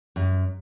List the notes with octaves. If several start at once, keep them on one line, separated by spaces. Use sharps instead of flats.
F#2